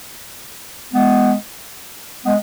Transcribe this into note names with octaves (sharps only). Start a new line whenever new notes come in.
G#3 B3
G#3 B3